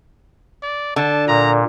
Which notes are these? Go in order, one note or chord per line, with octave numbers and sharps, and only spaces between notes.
D5
D3 A5
A#2 A#5